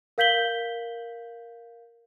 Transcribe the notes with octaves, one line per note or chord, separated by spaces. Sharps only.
A#4 F5 G6 B6 F#7 G7